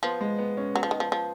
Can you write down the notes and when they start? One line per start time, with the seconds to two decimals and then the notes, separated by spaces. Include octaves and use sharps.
0.03 F3 B3
0.21 G#3
0.39 B3
0.57 C#4
0.75 F#3 B3
0.83 F3
0.91 D#3
1.00 F3
1.12 F3